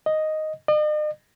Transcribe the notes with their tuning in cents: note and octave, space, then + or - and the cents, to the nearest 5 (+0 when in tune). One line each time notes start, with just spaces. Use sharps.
D#5 +0
D#5 -45